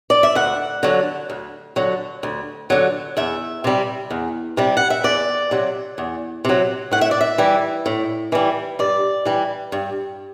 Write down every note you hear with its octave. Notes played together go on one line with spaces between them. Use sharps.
D5
E5
D2 F#5
D3 F#3
D2
D3 F#3
D2
D3 F#3
E2 E5
C3 G3
E2
C3 G3
F#5
E5
E2 D5
C3 F#3
E2
C3 F#3
A2 F#5
E5
D5
E5
E3 G3
A2
E3 G3
G2 D5
E3 G3
G2